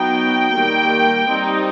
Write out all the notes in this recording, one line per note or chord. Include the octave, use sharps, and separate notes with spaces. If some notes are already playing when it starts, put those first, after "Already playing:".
Already playing: F#3 B3 D#4 G5
D#3 G3 A#3
G3 C4 D#4